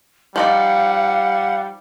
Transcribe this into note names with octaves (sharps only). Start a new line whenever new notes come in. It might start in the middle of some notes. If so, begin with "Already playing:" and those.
F3 G3 D#4 D5 F5 F#5